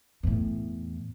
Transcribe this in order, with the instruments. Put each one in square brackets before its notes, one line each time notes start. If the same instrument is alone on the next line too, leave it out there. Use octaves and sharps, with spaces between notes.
[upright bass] E2 A2